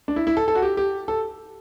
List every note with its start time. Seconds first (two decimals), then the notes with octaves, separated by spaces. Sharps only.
0.08 D4
0.16 E4
0.27 E4
0.37 A4
0.48 A4
0.55 F#4
0.62 G4
0.77 G4
1.08 A4